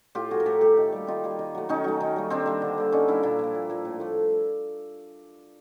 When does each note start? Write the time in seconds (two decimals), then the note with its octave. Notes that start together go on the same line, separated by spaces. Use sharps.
0.15 A2 F4 G4
0.31 F3 A3 F#4 G#4
0.40 A#4
0.46 A2 G4 A4
0.61 F3 A3 G4 A4
0.77 D#3
0.93 G3 A#3
1.07 D#3 D#4 F4
1.24 G3 A#3
1.39 D#3
1.55 F#3 A3
1.69 D#3 C#4 D#4
1.84 F#3 A3
2.01 D#3
2.16 G3 A#3
2.30 D#3 C4 D4
2.46 G3 A#3
2.62 D3
2.78 G3 A#3
2.92 D3 C#4 D#4
3.08 G3 A#3 D4 E4
3.23 A#2 D4 E4
3.39 F3 A#3
3.55 A#2
3.70 F3 A#3
3.85 A2
4.00 F3 A3